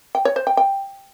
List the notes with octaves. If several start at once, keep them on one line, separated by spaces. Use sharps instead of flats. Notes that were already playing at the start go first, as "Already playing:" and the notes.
G5
C#5
C5
G5
G5